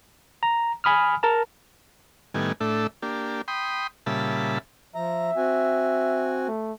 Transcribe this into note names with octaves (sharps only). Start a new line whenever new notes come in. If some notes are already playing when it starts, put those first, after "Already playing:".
A#5
G#5 B5 D#6 F6
A#4 A5 A#5
A2 D#3 G3 B3 G#5
A2 A3 D4 E5
A#3 D4 G4
G5 B5 C6 D#6
A#2 C#3 G3 E5 A5 B5
F3 E5 A#5
C4 F#4 G#5
A3